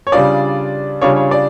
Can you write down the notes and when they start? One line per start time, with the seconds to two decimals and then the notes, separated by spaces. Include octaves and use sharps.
0.07 C#5
0.12 C#3 G3 D4 F4 D5
1.01 C#3 G3 D4 F4 C#5
1.16 C#5
1.31 D5